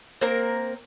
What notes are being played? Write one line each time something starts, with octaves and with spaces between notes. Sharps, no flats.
A#3 C4 A#4